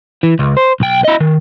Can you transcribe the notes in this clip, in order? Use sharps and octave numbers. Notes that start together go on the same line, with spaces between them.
E3
C#2
C5
B1 G5
E4 D#5
D#3